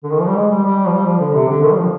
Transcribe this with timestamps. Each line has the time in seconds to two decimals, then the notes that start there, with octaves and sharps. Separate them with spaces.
0.04 D3
0.12 D#3
0.20 F3
0.27 G3
0.36 G#3
0.51 G3
0.64 G3
0.86 F3
0.92 G3
1.06 F3
1.20 D3
1.34 C3
1.48 D3
1.62 D#3
1.71 G3
1.77 F3